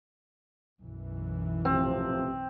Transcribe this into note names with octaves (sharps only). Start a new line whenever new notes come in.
B1 F#2 E3
A1 C3 F3 C4